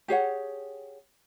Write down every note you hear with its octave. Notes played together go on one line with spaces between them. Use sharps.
G4 G#4 C#5 F#5